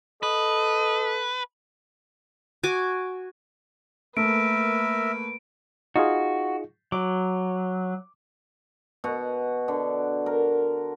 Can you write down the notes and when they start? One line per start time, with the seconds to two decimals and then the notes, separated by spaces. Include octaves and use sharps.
0.23 A4 B4 D#5
2.63 F#4 G#5 D6
4.17 A3 A#3 A#4 B4 E5 D7
5.96 D#4 F4 F#4 G#4
6.92 F#3 D6
9.04 B2 F#4 F#5
9.68 D3
10.26 A#4